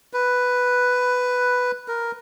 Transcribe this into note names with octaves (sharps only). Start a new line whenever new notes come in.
B4
A#4